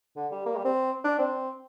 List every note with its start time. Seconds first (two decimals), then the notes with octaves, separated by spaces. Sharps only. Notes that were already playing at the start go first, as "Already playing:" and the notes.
0.16 D3
0.32 G3
0.46 A#3
0.56 G3
0.65 C4
1.04 D4
1.19 C4